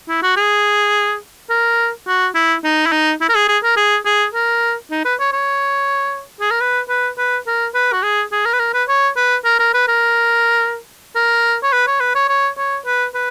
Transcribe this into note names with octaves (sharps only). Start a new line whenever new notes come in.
E4
F#4
G#4
A#4
F#4
E4
D#4
E4
D#4
E4
A#4
G#4
G#4
A#4
G#4
G#4
A#4
D#4
B4
C#5
C#5
G#4
A#4
B4
B4
B4
A#4
B4
F#4
G#4
G#4
A#4
B4
A#4
B4
C#5
B4
A#4
A#4
B4
A#4
A#4
C#5
B4
C#5
B4
C#5
C#5
C#5
B4
B4